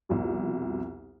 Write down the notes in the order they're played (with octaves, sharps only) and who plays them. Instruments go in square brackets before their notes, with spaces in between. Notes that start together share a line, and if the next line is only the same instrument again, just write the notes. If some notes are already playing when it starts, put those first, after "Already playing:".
[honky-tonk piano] C2 F2 B2